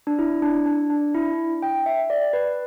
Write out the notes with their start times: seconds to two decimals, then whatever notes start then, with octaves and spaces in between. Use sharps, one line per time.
0.07 D4
0.19 E4
0.42 D4
0.66 D4
0.90 D4
1.14 E4
1.62 G5
1.86 E5
2.10 D5
2.33 B4